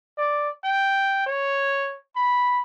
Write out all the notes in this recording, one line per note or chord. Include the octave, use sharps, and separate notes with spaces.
D5
G5
C#5
B5